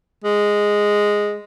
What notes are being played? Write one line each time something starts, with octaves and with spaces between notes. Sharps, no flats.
G#3